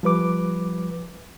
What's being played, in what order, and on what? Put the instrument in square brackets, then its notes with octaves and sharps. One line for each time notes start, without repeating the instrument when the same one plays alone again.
[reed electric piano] F3 G3 B4 D6